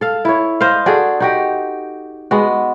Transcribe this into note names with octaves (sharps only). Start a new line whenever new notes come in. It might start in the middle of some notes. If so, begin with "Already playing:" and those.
A4 F5
E4 C#5
C5 D#5 F5
D4 F#4 G#4 A4
D#4 F#4 G4
G#3 B3 F#4